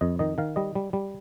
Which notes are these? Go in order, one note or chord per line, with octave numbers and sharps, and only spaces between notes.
F2 D#5
D#3 D#5
D#3 F5
G3 D#5
G3
G3